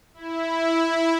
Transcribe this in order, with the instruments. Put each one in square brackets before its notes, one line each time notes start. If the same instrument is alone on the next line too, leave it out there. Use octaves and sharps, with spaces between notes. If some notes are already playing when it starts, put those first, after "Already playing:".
[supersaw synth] E4